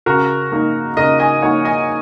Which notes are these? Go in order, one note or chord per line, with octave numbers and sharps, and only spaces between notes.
C#3 F#4 A#4
A#3 D#4
C#3 A#4 D#5
D#5 G#5
A#3 D#4 C#5 F#5
D#5 G#5